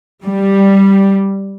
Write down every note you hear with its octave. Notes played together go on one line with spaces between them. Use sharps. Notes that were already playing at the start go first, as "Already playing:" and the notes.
G3